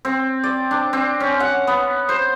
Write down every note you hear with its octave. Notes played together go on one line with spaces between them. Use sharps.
C4
D5
D4
C4
C#4
F#5
B3
C5